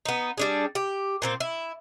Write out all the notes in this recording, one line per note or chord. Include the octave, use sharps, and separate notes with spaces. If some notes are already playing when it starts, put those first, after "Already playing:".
B3 D#4
G3 D4 G#4
G4
A#2 C4 C5
E4